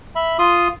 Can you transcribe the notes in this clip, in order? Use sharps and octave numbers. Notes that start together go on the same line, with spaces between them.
E5 B5
F4 C6 D#6